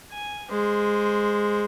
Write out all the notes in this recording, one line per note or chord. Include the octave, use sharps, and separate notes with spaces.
G#5
G#3 C5